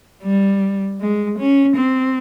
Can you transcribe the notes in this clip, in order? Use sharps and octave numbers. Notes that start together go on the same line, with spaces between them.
G3
G#3
C#4
C4